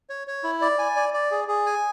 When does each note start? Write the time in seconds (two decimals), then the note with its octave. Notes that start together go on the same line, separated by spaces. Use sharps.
0.10 C#5
0.27 C#5
0.44 E4
0.62 D5
0.79 G#5
0.96 D5
1.14 D5
1.31 G#4
1.48 G#4
1.66 G#5